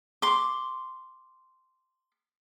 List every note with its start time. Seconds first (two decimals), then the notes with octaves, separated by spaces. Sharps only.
0.22 C6 D6